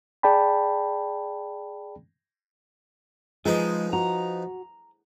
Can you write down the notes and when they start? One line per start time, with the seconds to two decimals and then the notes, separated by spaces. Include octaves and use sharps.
0.23 G#4 D5 G5 A5 B5
3.46 F3 G#3 D#4 G#4 B4
3.93 F#4 A#5